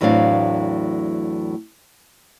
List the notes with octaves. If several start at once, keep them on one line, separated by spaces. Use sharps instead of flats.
E2 A2 F#3 C4 D4 F5